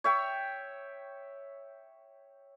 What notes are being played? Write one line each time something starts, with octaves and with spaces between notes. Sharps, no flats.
C#5 E5 G5